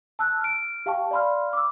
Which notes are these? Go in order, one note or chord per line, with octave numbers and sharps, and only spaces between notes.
A5 E6 F#6
F6 D7
G4 F5 G5 A5 C#6
D5 F5 B5 C6 F6
D6 E6